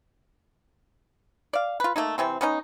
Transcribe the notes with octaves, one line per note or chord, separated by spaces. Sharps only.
D5 F5
F4 B4
A3 A#3 D#4
C3 E3 C4
B3 C#4 D#4